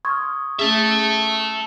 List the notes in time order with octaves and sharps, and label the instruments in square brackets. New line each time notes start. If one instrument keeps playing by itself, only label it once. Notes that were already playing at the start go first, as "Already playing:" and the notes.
[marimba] C6 F6 [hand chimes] C#6 D#6 G#6
[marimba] A3 C#4 G#4 [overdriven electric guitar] E5 A5